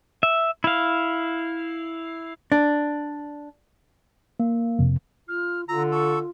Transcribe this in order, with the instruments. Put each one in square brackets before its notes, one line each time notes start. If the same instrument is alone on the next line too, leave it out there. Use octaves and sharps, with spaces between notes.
[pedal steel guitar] E5
E4 F5
[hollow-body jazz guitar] D4
[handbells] A#3
[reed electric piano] F2 C3
[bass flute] F4 [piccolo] F6
[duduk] D3 [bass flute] F4 [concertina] A#5 [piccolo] E6
[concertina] A4 [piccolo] C#6